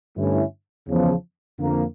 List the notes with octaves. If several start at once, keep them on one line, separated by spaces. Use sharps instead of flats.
G2 D3 A3 C#4 E4
E2 C#3 F3
F2 D3 F3 A#3